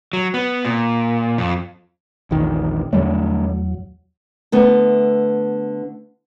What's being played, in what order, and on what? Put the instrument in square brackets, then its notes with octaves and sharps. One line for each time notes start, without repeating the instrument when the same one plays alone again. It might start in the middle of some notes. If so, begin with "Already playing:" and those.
[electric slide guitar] F#3
B3
A#2
F2
[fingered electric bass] A#1 E2 D#3
[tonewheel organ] E2 F#3 [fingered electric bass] D3 G3 A3
[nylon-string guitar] D3 A3 B3